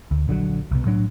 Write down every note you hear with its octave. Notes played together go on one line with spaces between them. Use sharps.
D2
A#1 D3 F3 F#3
C2 B2
A2 F#3 D4